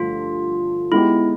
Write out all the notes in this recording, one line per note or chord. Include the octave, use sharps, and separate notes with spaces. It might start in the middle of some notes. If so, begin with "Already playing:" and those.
Already playing: G2 D3 F3 A3 F4
G#3 B3 D#4 E4 G4